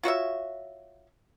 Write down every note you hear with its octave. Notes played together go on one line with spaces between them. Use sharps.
F4 F#4 C#5 E5